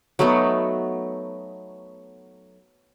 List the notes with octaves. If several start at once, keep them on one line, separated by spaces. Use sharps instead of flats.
F#3 A3 B3 D#4